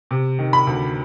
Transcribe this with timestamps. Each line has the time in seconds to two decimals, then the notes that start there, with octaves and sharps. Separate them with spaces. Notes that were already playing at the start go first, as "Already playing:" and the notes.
0.11 C3
0.39 D#3
0.53 B5
0.67 D2